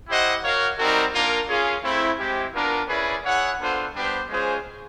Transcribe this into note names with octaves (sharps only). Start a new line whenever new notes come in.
E4 G4 C5 D#5 F#5
F#4 A#4 C#5 F5
G3 C4 D#4 F#4 A#4
A#3 D4 F4 A#4
C#4 F4 G#4
A3 C4 E4
G#3 C4 E4 G4
B3 D4 F4 A#4
C#4 E4 G#4 B4 D5
E4 G#4 C#5 F#5
B3 D4 F4 A4 C5
G3 B3 D4 G4 C5
G#3 C#4 F4 G#4 C5